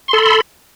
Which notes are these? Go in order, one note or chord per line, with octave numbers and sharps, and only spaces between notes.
A4 B5 C6